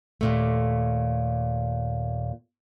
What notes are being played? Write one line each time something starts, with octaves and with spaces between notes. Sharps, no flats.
D#2 A#2 A3